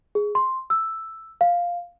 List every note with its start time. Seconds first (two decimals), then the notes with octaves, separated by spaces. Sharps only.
0.15 G#4
0.35 C6
0.70 E6
1.41 F5